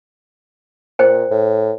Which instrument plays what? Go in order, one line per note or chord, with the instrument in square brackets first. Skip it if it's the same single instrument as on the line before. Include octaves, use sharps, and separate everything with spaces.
[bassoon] A#2 [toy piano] C5 G5
[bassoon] A2